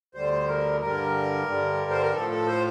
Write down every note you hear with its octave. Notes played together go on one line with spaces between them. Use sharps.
D2 D3 G3 C5
A#4
G2 D3 G3 A#4
G2 D3 G3
C5
A#4
A2 F3 A4
A4
C5